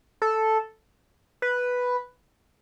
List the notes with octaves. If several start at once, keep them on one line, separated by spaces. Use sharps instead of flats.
A4
B4